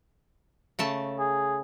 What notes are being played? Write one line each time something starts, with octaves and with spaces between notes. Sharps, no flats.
C#3 A3 A5
G#4